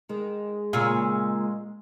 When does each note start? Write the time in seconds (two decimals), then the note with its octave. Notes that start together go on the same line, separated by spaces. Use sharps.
0.09 D#3 G#3
0.73 A#2 C#3 F4 G#4 E6